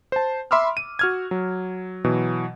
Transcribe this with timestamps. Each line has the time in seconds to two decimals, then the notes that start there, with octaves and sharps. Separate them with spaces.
0.12 C5 A5
0.51 E5 B5 C6 D6 E6 F6
0.77 D#7
0.99 F#4 F6 G#6
1.31 F#3
2.04 B2 E3 F#3